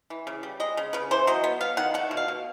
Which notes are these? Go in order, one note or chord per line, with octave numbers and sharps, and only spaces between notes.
E3
C#3
G3
G#3 D#5
C#3
C#3 B4
E3 C5
F#3 D#5
B3
B3 F5
D#3 F#5
A3 F#5
B2
F5
B2